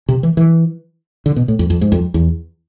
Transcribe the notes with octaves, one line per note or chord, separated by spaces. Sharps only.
C3
E3
E3
D3
B2
A2
F2
F2
G#2
F2
E2